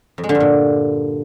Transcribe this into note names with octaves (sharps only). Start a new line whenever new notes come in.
F2
G#3
D3
G2
A#2